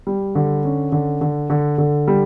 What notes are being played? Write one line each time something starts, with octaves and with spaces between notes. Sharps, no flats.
G3
D3
C#4
D3
D3
D3
D3
G3